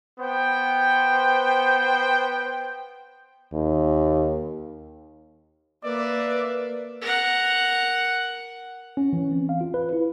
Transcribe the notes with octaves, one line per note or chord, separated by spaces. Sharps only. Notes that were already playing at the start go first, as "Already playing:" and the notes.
B3 C5 G5
D#2
A#3 B4 D5 E5
A#4 F#5
C#4
E3
C4
F5
F4
B4
E4